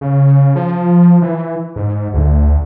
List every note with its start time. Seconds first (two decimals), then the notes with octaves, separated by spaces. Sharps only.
0.01 C#3
0.56 F3
1.22 E3
1.76 G#2
2.14 D2